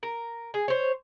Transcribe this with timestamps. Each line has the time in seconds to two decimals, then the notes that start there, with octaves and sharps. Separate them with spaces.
0.03 A#4
0.54 G#4
0.68 C5 C#5